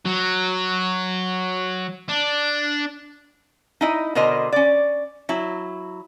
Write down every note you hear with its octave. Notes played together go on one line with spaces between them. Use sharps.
F#3
D4
D#4 E4 D#5
B2 D3 A#4 C5 D#5
C#4 D5
F#3 E4